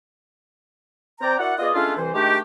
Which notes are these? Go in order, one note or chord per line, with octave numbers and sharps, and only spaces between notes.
C4 D5 G5 A#5
E4 F#4 A#4 D5 F#5
B3 F4 G#4 D5 D#5
G#3 A3 C#4 D4 E4 F4
C2 E3 C5
D#3 G#3 A3 D4 G4